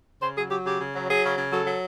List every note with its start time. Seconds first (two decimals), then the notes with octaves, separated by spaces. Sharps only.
0.22 C#3 C5
0.36 F#3 G#4
0.50 F#3 G4
0.65 C#3 G4
0.80 C#3
0.94 F#3
1.09 F#3 G#4
1.24 C#3
1.38 C#3
1.52 F#3 A4
1.66 F#3